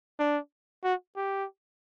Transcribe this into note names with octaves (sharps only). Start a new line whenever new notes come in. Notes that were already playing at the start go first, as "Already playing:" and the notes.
D4
F#4
G4